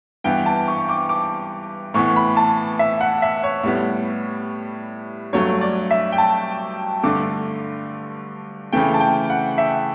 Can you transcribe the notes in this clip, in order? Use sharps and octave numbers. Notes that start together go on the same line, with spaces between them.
G2 E3 B3 G5
A5
C#6
D6
D6
A2 E3 B3 C#6
B5
A5
E5
F#5
E5
C#5
A2 G3 B3
G2 F#3 A3 C#5
D5
E5
G5
A5
G2 D3 A3 D6
C#3 E3 A3 G5
A5
G5
F#5
E5